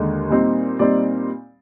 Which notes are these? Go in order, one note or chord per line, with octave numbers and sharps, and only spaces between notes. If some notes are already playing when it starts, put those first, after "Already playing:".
Already playing: D#2 D3 G#3
A#2 G3 C4 D#4
A#2 G3 C4 D#4 D5